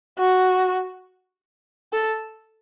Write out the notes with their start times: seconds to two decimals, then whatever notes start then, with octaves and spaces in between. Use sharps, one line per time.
0.18 F#4
1.93 A4